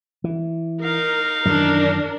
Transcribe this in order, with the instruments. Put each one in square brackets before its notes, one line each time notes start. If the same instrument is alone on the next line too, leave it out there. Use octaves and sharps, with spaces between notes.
[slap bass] E3
[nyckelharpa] D#4 F5 [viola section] A#4
[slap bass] F#2 D#3 E3 [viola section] D4 A#4